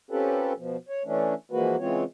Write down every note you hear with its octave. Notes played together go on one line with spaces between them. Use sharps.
C4 C#4 F4 G4 A4 B4
B2 F3
C#5
E3 A3 C#4 D4
E3 F3 G#3 A#3 F#4 B4
C#3 E3 G#3 C4 F4 C#5